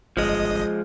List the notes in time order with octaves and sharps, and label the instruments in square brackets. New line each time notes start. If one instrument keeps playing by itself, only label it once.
[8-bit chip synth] G1 D#5 [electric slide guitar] F3 G#3